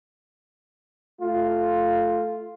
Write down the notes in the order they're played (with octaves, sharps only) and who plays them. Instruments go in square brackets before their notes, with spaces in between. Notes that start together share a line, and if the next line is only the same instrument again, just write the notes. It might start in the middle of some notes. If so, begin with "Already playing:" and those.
[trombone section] A3 F4